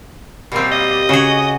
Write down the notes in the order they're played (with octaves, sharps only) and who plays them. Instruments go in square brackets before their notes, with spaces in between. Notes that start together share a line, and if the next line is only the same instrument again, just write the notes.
[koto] B2 C4 [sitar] G3 A#3
[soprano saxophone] D#5
[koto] C#3 G#4 [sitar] F#4